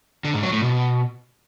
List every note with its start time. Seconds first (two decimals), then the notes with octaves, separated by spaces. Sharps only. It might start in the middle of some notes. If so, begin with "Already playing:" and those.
0.24 D3
0.34 G#2
0.43 F#3
0.53 A2
0.62 B2